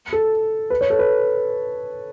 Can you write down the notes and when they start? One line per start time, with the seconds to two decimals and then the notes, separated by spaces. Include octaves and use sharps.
0.13 A4
0.70 B4
0.81 C#5
0.90 A4
0.99 B4